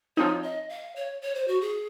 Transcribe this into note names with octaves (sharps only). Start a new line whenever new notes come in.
F3 C4 D#4 C#5
D#5
F5
C#5
C#5
C5
F#4
G#4